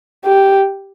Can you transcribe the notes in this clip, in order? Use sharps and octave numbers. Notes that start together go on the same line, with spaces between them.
G4